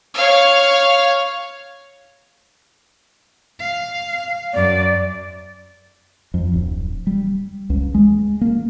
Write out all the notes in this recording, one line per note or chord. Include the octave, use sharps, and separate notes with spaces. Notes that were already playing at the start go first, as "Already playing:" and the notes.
C#5 F5
F5
F#2 D5
F2
D1
G3
C#2
G#3
A#3